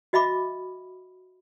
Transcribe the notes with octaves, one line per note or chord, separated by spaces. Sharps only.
F#4 D#5 E5 B5 D6